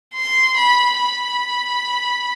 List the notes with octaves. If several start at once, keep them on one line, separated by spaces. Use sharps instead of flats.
C6
B5
B5